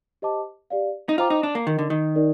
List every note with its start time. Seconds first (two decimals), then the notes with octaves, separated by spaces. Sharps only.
0.22 G4 C5 D#5 A5 D6
0.70 G4 D5 F5
1.09 D#4
1.18 F4 C5 G5 A#5 D6
1.30 D#4
1.43 D4
1.55 A#3
1.67 D#3 D#4 A#4 D#5
1.79 D3
1.90 D#3
2.15 D#4 A#4 D5